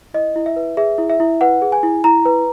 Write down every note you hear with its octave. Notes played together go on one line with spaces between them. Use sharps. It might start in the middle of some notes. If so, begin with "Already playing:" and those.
E4 D#5
E4
E5
B4
G#4 E5
E4
E5
E4
B4 F#5
G#4
G#5
E4
E4 A#5
B4